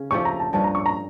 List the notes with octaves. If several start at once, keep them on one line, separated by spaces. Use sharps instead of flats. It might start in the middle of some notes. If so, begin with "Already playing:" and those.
Already playing: C#3
F3 A3 C#4 G4 C#6
A#5
A5
G2 F3 C#4 A5
A#5
C#6
A#5